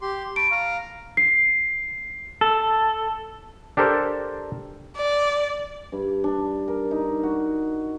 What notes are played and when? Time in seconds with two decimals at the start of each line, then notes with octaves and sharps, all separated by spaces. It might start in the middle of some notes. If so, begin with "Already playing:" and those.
0.02 G4 C6
0.36 A5 B5 C#6 D7
0.51 F5 A#5
1.17 C7
2.41 A4
3.77 D4 G4 A4 A#4 C5
4.96 D5
5.92 G2
6.24 D4
6.68 A#4
6.91 D#4
7.23 F#4